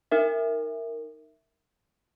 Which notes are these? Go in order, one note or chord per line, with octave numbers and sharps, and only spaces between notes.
D#4 A#4 E5